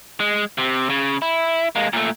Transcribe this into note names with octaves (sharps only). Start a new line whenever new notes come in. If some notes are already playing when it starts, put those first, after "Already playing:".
G#3
C3
C#3
E4
G#3 A#3
A#2 A3